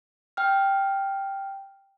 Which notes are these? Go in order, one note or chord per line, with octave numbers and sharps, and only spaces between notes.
G5 F6